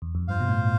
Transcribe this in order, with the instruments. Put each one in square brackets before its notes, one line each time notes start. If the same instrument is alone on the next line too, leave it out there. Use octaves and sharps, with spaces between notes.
[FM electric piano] E2
F2
[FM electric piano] G2 [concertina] F4 C5 F5
[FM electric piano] B2
A2